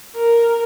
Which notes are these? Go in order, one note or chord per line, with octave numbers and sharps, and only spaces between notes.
A#4